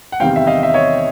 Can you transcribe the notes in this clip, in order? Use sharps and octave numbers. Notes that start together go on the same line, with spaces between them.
F#5
E2 C3 D#3 G3 C4 F5 G5
E5
D#5 F5
E5
C#5 D#5